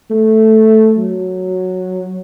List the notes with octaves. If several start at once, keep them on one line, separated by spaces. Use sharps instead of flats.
A3
F#3